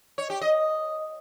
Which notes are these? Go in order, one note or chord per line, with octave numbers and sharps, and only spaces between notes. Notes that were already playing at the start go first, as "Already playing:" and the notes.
C#5
G4
D#5